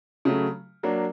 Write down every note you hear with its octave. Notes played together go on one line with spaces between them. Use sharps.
C#3 F#3 A3
F#3 A#3 D4